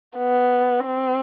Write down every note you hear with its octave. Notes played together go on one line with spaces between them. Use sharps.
B3
C4